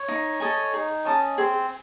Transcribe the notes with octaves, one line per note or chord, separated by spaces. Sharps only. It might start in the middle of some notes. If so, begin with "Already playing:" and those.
Already playing: C#5
D#4
A4 D#5 G#5
D#4 G#4
C#4 D#5 A5 D#6
C4 G#4